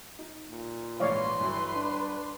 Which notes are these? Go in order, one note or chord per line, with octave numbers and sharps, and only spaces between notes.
D#4
A#2
A#1 G#2 E3 B4 C#5 D5 F5 C6
G1 E3 F#3
D4